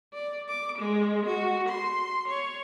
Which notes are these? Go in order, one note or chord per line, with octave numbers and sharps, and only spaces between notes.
D5
D6
G#3
F#4
C6
C#5